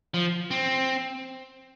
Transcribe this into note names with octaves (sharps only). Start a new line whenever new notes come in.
F3
C4